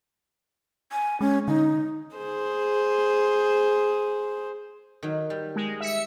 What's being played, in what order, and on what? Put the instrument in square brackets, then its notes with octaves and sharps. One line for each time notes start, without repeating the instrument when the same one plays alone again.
[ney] G#5
[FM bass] G#3 [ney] C#4
[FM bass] D3 [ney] D#4
[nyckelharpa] G#4 C5
[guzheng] D#3 F#3
G3
[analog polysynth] G#3
E5 C#7